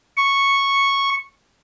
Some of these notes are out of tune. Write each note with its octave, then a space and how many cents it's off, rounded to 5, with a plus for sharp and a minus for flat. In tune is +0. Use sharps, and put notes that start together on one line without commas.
C#6 -5